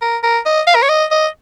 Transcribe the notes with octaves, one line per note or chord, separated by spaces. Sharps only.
A#4
A#4
D#5
F5
A#4
C#5
D#5
D#5